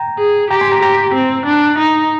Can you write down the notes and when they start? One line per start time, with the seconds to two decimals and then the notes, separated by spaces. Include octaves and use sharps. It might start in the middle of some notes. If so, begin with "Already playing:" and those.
Already playing: G5 A#5
0.18 G#4
0.50 G4 G5 A#5
0.61 G#5 C6
0.72 G5 A#5
0.82 G4 G5 A#5
1.14 C4
1.46 D4
1.78 D#4